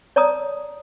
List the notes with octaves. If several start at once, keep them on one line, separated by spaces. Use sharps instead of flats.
C#5 D5 A5 A#5 D#6